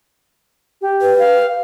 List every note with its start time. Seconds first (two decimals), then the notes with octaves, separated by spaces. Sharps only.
0.82 G4
1.02 B4
1.19 F5